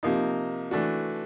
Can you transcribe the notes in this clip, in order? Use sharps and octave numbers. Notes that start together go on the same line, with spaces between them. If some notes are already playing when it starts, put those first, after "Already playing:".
C3 F3 A#3 D#4
E3 A3 D4 F#4